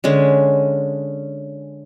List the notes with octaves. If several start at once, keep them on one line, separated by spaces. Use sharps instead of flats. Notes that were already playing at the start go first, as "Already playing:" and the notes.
D3 G#3 C#4